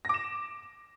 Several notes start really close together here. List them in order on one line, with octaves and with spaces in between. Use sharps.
A#6 D6 E7